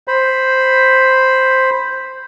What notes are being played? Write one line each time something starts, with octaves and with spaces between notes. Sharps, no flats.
C5 B5